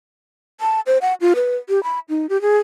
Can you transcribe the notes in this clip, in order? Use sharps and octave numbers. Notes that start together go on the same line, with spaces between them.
A5
C5
F#5
F4
B4
G4
B5
D#4
G4
G#4